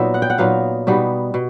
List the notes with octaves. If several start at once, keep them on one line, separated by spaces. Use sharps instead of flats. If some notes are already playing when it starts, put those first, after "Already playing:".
Already playing: A#2 F#3 B3 D#4 E5
F#5
G5
F#5
A#2 F#3 B3 D#4 F5
B2 G3 B3 D#4
B2